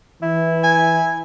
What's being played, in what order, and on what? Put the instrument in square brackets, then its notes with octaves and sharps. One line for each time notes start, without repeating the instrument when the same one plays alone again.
[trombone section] E3 [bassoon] E4
[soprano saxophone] G#5